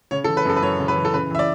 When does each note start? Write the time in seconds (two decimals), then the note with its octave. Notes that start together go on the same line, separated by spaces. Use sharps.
0.11 C#3 C#5
0.24 A4
0.28 E3
0.37 B4
0.45 F#2 A4
0.56 B4
0.62 F#2 C#5
0.80 C#3
0.88 B4
0.96 E3
1.05 A4
1.14 C#3 B4
1.31 E3 E5
1.39 D5